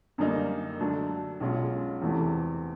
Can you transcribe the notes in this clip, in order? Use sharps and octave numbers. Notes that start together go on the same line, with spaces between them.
F#2 D3 G3 A#3 D#4
D3 F#3 A3 D4
B1 B2 G#3 C#4 F4
E2 C3 E3 A3